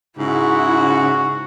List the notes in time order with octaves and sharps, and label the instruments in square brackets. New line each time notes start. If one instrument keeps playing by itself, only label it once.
[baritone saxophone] G#2 [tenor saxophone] C#3 [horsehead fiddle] E4 [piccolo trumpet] F#4